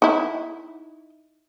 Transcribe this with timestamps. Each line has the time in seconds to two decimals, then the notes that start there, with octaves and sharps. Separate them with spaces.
0.02 D#4 E4